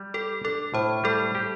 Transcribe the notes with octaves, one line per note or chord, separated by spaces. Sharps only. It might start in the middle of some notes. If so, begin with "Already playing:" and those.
Already playing: G3
G4 A4
D4 A4
A2 C5
G3 A4
G4